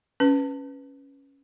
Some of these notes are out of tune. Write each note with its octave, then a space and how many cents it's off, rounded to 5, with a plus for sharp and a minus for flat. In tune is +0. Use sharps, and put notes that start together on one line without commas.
C#4 +0 B4 +0